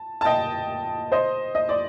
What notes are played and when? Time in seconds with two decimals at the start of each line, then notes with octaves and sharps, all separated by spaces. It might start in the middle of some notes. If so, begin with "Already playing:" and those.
Already playing: A5
0.21 A5
0.25 D#5 G5
1.12 C5 D#5
1.55 D#5
1.69 D5